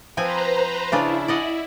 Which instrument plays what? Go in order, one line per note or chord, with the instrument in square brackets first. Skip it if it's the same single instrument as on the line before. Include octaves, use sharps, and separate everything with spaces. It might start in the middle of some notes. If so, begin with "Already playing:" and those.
[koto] F3 C4 G#5 [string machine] B4 C5 A#5
[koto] C#3 D4 F4 [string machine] E4
[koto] D5 D#5 F#5